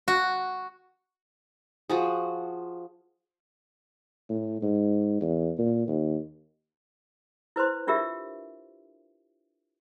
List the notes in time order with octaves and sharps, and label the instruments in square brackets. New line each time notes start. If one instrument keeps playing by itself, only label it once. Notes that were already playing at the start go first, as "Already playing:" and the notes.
[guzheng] F#4
[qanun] F3 F#4 G#4
[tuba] A2
G#2
E2
A#2
D#2
[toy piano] E4 B4 C5 C6
D4 F4 G4 A#4 E5